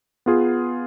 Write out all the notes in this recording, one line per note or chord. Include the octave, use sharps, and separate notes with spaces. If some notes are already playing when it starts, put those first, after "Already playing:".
B3 F4 G#4